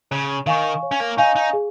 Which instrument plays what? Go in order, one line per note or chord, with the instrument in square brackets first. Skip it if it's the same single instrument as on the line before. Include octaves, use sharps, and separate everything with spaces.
[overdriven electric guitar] C#3 [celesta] C#5
[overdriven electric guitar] D#3 [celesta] F5 G#5 C#6
[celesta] C#5
[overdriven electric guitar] C#4
A#3
[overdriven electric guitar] D#4 [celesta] F5 G#5 C#6
[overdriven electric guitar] D#4
[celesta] G#4